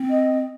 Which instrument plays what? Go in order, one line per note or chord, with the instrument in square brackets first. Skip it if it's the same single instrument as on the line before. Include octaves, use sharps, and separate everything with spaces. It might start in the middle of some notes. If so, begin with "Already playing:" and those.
Already playing: [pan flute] C4
[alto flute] D#5